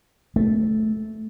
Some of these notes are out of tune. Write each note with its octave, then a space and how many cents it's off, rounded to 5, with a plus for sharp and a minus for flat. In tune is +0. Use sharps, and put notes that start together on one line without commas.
A3 -10